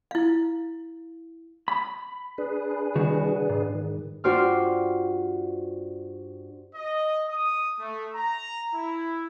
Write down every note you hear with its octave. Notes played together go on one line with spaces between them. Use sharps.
E4 F5
B5
D4 G#4 B4
C2 D#3 F#4
G#2
D#3
G2 F4 F#4 C5 D6 F6
D#5
D#6
A3
A#5
E4